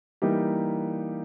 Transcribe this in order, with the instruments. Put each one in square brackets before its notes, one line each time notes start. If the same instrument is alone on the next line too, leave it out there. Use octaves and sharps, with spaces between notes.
[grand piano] E3 G3 A#3 D#4 G4